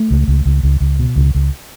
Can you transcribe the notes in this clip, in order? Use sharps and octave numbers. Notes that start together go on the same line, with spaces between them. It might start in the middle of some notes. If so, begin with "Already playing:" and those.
Already playing: A3
C#2
C#2
C#2
C#2
C#2
B2
C#2
C#2